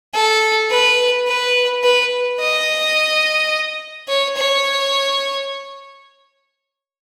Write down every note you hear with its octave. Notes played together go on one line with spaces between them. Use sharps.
A4
B4
B4
B4
D#5
C#5
C#5